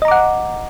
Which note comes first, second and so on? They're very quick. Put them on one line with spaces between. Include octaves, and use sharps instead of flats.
D#5 A#5 D6 F#5